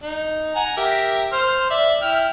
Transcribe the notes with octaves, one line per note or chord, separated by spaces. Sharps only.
D#4
F#5 G#5 A#5
G4 A#4 E5
C5 F6
D5 E5
E4 G5 F6